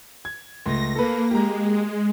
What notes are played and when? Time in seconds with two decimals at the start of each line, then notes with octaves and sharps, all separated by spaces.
0.25 G#6
0.66 C#2 A3 C6 A#6
0.96 A#3 A4 B4
1.31 G#3 G4 A#5